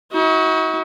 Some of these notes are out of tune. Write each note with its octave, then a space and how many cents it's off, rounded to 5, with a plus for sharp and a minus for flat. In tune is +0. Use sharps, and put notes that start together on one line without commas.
D#4 +45 F#4 +0